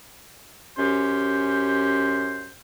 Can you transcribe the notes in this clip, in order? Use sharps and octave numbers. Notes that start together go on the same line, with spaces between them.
F#2 C#4 G4 C5